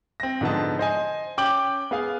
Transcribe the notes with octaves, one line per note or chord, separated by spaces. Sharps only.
C4 A#6
G#2 D3 F3 B3 D#5 A5
C5 D#5 G#5
C#4 G5 D6 G6 F#7
B3 G#4 F5 G#5